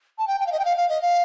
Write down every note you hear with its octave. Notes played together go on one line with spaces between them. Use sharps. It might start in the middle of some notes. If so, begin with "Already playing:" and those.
A5
G5
G5
F5
D#5
G5
F5
F5
D#5
F5